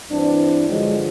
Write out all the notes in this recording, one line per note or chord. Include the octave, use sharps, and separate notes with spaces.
G2 E3 C4 D4
G2 D3 F3 F#3 G#3